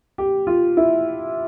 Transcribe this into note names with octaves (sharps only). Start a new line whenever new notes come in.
G4
F4
E4